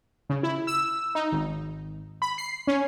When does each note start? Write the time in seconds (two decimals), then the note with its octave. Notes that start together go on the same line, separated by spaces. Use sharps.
0.29 C#3
0.43 E4
0.67 E6
1.15 D#4
1.32 G#1
2.22 B5
2.38 C7
2.67 C#4